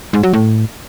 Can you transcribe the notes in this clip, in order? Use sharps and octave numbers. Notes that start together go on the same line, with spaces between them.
G#2
F#3
A2